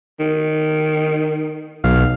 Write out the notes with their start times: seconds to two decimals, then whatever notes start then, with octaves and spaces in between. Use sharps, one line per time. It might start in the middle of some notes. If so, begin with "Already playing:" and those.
0.20 D#3
1.84 B1 F5